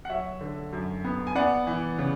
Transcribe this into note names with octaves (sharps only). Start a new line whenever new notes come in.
F#5
F#3 C#5 E5
D3
F#2
B3
G#5
B3 D5 F#5
E3
C#3